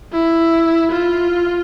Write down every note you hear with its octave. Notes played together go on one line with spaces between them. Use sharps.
E4
F4